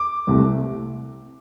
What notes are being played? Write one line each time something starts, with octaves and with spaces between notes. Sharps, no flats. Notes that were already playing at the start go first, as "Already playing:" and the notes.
Already playing: D6
C2 C3 A3